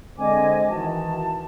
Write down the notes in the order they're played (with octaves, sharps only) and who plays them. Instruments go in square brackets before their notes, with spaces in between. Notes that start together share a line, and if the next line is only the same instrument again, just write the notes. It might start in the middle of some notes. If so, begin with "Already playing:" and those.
[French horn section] D3 G#3 C4 [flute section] D#5 G#5 D6
[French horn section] D#3 E3 F#4 [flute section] A5